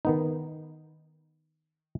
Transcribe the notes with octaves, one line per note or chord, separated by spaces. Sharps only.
D#3 B3 D#4